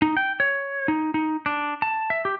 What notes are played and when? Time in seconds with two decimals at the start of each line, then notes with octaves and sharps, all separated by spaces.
0.02 D#4
0.17 G5
0.40 C#5
0.88 D#4
1.14 D#4
1.46 D4
1.82 A5
2.10 E5
2.25 G4